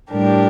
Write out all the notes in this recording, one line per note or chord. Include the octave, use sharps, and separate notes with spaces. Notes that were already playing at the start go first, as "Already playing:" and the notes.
A2 G3 D4 G4 A#4